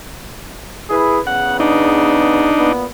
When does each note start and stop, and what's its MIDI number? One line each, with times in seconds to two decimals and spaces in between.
0.90 1.18 64
0.90 1.18 68
0.90 1.18 71
1.27 2.52 40
1.27 2.52 49
1.27 2.52 59
1.27 1.57 78
1.60 2.72 62
1.60 2.72 63
2.56 2.85 46
2.56 2.85 59